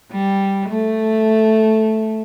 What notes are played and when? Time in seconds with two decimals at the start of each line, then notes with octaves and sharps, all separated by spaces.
0.12 G3
0.69 A3